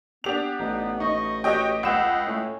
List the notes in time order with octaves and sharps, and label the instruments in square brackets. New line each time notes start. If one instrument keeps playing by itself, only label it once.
[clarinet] B3 [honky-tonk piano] D4 G4 F7
[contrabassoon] A1 [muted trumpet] D#4
[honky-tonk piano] D#4 [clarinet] D#5 [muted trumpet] C#6
[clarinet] F#4 [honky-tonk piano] G4 D#5 G5 [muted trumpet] C#5
[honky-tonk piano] C#2 E7 [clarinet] D#5 [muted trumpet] F#5
[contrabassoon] A2 [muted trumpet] C#4